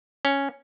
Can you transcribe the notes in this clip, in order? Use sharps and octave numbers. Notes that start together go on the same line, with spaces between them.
C#4